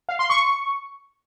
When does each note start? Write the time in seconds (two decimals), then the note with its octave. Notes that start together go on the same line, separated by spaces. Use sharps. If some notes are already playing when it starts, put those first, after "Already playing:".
0.09 F5
0.19 C6
0.30 C#6